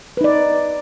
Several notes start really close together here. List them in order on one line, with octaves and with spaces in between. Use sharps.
B4 D#4 D5